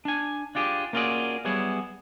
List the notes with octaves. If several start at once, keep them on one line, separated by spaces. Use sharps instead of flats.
D4 G#5
D4 F4 G4 G#4
A#3 C#4 F4 F#4 G#4 D5
F#3 G3 B3 E4 G#4 C#5